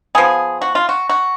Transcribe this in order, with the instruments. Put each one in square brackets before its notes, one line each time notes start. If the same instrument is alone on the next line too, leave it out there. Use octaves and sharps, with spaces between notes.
[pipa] F3 B3 G#4
F#4
F4
F#4
F#4